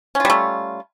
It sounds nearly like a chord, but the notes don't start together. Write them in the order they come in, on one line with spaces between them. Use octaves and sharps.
C#4 F4 G3 A3